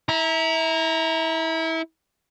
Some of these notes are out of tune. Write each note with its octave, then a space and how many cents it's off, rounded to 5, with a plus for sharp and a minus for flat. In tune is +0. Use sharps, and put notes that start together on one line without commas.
E4 -25 A#5 +5